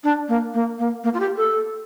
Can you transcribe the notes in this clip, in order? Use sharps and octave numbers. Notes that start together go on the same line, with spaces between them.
D4
A#3
A#3
A#3
A#3
F4
G4
A4